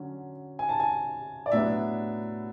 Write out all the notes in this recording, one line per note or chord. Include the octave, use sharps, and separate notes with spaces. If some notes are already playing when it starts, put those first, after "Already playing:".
Already playing: D3 F#3 C#4
G#5
A5
G#5
D5
A2 F#3 B3 D4 E5